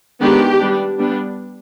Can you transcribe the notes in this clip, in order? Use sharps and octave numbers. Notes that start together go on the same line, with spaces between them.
D#3 G#3 B3 D4 G4
G3 B3 D4
G3 B3 D4